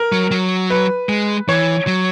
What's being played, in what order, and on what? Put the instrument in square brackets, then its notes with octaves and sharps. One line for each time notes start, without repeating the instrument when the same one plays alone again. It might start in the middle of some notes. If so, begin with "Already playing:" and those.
Already playing: [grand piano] A#4
[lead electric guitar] F#3
F#3
[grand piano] B4
[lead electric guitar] G#3
[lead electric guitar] E3 [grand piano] C#5
[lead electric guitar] F#3